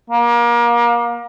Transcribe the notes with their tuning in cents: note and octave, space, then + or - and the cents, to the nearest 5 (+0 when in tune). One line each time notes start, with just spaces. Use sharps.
A#3 +30